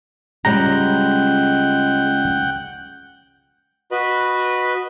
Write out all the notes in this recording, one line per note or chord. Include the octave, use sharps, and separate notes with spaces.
C#2 G3 G#3 F#5 G5 A#5
F#4 B4 D#5 B5